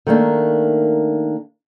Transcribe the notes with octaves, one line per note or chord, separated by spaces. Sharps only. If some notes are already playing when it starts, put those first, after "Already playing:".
D#3 A3 A#3 D4